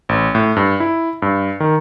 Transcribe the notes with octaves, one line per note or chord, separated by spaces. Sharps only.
A1
A2
G2
E4
G2
D#3